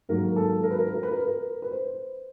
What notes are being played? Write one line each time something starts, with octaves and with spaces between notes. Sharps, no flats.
G#2 D#3 F#3 A#3 A#4
A4
A#4
B4
A#4
B4
A#4
B4
A#4
B4
A#4
B4
C5